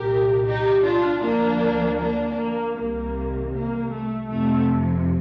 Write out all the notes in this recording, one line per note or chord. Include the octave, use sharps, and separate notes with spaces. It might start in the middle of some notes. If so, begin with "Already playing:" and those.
Already playing: C2 A#2 G3 G4 A#4
D#4 G4
D4 F4
D2 D3 F3 A#3 D4
A#3 D4
A#3
C2 C3 D#3 G3 A#3
A#3
A3
F2 C3 F3 A3